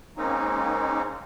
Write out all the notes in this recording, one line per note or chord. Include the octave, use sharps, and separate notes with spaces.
G#3 A#3 C4 C#4 D#4